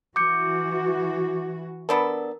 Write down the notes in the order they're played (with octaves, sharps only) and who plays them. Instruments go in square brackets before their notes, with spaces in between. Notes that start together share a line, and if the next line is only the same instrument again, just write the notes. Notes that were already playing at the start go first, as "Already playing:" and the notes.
[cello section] E3 F#4 [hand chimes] D6 G6 C#7
[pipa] B3 D4 A4 [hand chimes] A#4